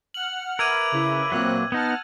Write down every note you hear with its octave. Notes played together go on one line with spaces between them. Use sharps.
F#5 F6 F#7
A#4 B4 E5 D6 E6 G#6 D#7
C#3 E4
A#2 F#3 A#3 C4 F#6
B3 D#4 F#5 A5 F6